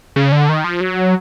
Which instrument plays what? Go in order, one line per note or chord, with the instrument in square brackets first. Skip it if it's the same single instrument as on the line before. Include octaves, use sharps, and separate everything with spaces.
[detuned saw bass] C#3
D3
D#3
F3
F#3